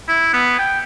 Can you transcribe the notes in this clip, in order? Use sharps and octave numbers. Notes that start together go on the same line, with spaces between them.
E4
B3
G5